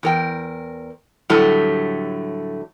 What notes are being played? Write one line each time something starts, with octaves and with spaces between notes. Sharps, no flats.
E2 A#4 G5
A2 D3 F#3 G3 A3